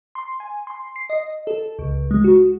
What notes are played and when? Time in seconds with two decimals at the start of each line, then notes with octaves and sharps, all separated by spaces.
0.15 C6
0.40 G#5
0.67 C6
0.96 C7
1.10 D#5
1.47 A4
1.79 C#2
2.11 G#3
2.24 F#4